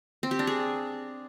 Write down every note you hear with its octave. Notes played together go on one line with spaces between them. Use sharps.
C4
G4
D4
G#4